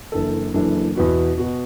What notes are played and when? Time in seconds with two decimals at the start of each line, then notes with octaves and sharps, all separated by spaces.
0.12 F#1 F#2 E3 D4 A4
0.54 F#1 F#2 E3 D4 A4
0.96 E2 B2 B3 F#4
1.38 B2 B3 F#4